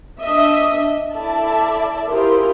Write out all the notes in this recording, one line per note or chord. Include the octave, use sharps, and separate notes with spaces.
D4 D#5 E5
E4 A4 D5 E5 A5
E4 F4 G4 G#4 A#4 C5